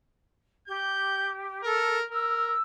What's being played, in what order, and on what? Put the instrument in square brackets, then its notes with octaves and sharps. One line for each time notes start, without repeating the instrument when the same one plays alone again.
[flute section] G4 [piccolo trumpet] G6
[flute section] A4 [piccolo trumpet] A#4
[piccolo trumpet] A#4 [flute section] E6